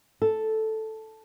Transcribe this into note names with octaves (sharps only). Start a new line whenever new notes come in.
A4